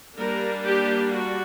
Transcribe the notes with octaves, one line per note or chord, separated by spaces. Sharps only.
G3 A#3 D4 A#4
G4
F#4